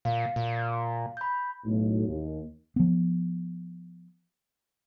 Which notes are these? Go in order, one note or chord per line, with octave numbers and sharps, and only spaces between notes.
A#2 F5
A#2
B5 G6
B1 A2
D#2
F3 B3